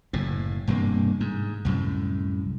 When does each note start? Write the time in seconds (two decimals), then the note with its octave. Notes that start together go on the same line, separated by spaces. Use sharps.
0.13 F#1 A2
0.67 E1 G2 C3 A#3
1.20 G#2
1.65 C2 F#2 A2